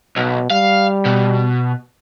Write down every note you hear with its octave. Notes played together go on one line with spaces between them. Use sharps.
B1 B2
G3 F5
B2